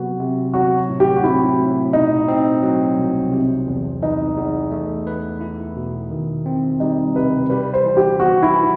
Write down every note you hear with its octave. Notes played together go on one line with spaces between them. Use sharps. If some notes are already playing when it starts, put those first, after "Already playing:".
Already playing: C3 F#3 B3 F#4
C3
F#3 F#4
A2
G4
F#4
C4 E4
A2
B2 D#4
C4
F#3
C2
C3 C4
E2
E3 D#4
E2
A3
B4
E4
B2
D#3
C4
G3 D#4
C3 B4
G3 B4
C5
E3
G4
B3 F#4
E4
E3